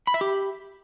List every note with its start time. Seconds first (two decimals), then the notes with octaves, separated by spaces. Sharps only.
0.07 B5
0.14 E5
0.21 G4